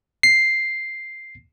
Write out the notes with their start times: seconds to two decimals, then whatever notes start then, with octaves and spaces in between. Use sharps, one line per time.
0.23 C7